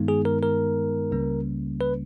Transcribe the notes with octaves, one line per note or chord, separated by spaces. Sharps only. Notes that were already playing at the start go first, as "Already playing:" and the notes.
Already playing: G2 D#3 G#3 B3 D#4
G#4
A#4
A#4
C#2 C#3 G3 A#3 C#4
B4